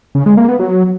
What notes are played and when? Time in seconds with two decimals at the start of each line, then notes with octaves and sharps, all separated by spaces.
0.15 C#3
0.26 G#3
0.37 A#3
0.48 B3
0.59 F#3